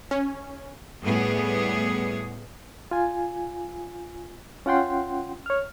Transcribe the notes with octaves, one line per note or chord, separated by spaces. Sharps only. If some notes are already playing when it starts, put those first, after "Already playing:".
C#4
A2 G3 B3 G#4
F4 G#5
C#4 F4 F#5 G5 C6
C#5 F6